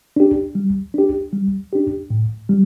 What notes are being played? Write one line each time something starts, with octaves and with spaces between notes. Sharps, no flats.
D4 G4
G3
D4 G4
G3
D4 G4
A2
G3